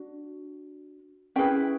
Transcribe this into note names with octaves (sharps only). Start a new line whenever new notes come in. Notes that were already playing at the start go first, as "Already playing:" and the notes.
Already playing: D4 F#4
C#4 E4 G#4 B4 G5